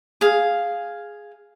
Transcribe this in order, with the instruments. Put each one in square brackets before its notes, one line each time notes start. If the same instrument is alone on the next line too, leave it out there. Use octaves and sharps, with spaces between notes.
[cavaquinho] G#4 F5